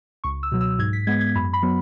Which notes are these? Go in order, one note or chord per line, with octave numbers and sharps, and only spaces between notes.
C#2 C#6
E6
B2 F#3
E6
G#2 G#6
B6
G#3 B3 G#6
G#6
F#2 B5
B5
F#3 B3